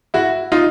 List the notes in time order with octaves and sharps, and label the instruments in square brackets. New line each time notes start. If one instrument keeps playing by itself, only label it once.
[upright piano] E4 F#4
D#4 F4